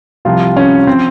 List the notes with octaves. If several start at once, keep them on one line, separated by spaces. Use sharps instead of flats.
C2 C3 F3 F4
C#4
F3 C4